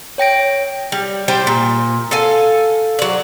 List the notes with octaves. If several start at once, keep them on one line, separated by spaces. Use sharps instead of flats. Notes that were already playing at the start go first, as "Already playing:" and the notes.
C#5 G5 A#6 D7
G3
G3 G4 C5 G5
A#2
A4 F5 G#5
F#3 D5